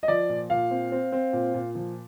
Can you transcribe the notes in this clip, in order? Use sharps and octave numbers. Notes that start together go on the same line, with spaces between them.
D#5
F3 D5
A#2
A#2 F5
C4
C4
C4
A#2
A#2
F3